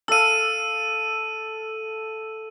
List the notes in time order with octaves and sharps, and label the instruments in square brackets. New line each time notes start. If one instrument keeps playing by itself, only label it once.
[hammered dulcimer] A4 F5 [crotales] E6 D#7